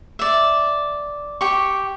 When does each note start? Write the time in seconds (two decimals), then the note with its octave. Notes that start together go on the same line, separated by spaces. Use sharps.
0.19 D5 E5
1.41 G4 C#6